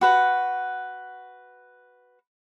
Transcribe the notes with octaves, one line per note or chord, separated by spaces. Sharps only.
F#4 B4 F#5